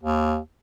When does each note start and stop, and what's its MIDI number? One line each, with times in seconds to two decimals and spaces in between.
0.03 0.38 39